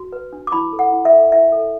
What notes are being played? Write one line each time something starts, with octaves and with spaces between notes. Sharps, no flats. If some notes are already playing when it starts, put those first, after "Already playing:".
Already playing: F#4
B4
D4
D6
E4 B5
A4
F#5
E4
E5
A4
E4 E5
A4